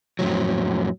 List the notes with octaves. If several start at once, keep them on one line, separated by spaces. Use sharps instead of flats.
F2 A2 C3 F#3